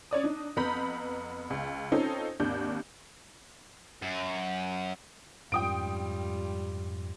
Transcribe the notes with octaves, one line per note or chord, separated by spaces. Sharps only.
C#4 C#5 D5 D#6
D4 D#4
F2 B3 A#5 B5 G6 B6
C#2
C4 C#4 D#4 F4 A4
G#1 D#2 D4 G6
F#2
F2 G#2 G3 C#4 F4 G5 D#6 D7